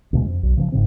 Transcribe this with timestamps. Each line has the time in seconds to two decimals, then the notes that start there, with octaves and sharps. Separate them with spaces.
0.13 D2 B2 G#3
0.26 F2
0.43 B1
0.57 C#3 E3 F3
0.72 G1 G#2 C#3 C4